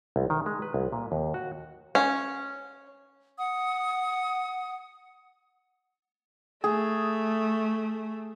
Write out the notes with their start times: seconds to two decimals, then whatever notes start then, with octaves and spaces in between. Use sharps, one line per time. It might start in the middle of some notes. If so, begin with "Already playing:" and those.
0.16 C2
0.30 D#3
0.46 G#3
0.62 B4
0.74 C2
0.92 A#2
1.12 D#2
1.34 F#4
1.95 C#4
3.38 F#5 D#6
6.64 A3 G#4